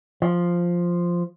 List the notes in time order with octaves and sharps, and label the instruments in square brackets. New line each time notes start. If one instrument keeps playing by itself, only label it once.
[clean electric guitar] F3